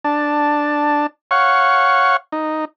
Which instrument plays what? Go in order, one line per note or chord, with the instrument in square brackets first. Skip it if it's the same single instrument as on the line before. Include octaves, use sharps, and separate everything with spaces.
[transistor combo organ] D4 A5
C#5 F5 F#5 C#6
D#4